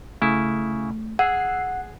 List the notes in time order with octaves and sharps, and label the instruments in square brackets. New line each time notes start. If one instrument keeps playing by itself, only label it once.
[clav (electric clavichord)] C#3 E4 [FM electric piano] A3
[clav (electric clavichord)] G#4 [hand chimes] F#5 [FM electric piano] E6 F#6 C7